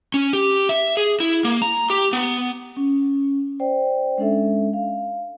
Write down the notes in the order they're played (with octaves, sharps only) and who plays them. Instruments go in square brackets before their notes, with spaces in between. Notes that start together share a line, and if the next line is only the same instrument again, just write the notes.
[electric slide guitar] C#4
G4
E5
G#4
E4
A#3
A#5
G4
B3
[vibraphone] C#4
C5 D5 G5
G#3 C#4 D4 A4 E5
F5